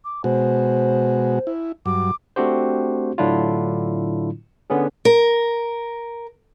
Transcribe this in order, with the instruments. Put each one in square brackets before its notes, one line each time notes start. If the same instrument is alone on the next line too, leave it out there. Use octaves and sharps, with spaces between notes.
[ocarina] D6
[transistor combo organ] B2 G#3 F#4 [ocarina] C5
[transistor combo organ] E4
[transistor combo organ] G2 F#3 [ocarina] D6
[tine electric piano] A3 C4 D4 F#4 G4 C5
A2 D3 F#3 D4 E4 F4
D3 B3 C#4 G#4
[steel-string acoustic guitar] A#4